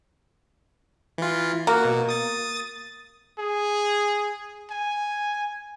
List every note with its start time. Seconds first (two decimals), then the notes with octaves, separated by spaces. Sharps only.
1.18 E3 F4
1.67 A#3 F#4
1.85 B2
2.09 D#6 A6
3.40 G#4
4.70 G#5